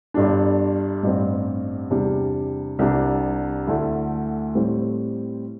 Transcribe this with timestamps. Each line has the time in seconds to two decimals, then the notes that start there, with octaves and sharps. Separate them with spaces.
0.14 G1 G2 G3 D4
1.03 A1 G2 G3 C4
1.90 E2 C3 G3 D4
2.79 C2 C3 G3 D4
3.67 D2 D3 A3 E4
4.55 A2 G3 C4